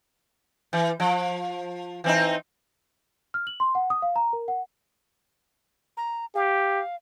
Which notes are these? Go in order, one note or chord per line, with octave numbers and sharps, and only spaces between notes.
E3
F3
E3 C4 D#4
F6
F#7
C6
F#5
D#6
F5
A#5
A#4
F#5
A#5
G4 F5